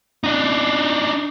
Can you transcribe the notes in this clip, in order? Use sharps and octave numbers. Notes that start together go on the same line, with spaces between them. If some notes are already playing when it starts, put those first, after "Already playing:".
D4 D#4